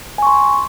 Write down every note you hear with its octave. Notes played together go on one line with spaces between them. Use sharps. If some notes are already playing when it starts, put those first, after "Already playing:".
G#5 C6 C#6